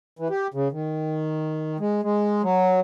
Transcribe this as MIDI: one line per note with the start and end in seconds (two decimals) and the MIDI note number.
0.19 0.28 52
0.30 0.47 67
0.54 0.68 49
0.72 1.77 51
1.80 2.01 56
2.03 2.42 56
2.43 2.80 54